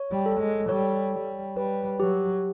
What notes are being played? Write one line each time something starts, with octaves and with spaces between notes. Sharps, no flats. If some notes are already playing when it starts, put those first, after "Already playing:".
Already playing: C#5
G3
A4
G#3
G3 C#5
G3 C#5
G3 B4
F#3 G4